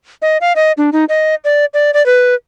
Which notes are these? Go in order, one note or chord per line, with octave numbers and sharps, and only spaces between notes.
D#5
F5
D#5
D4
D#4
D#5
D5
D5
D5
B4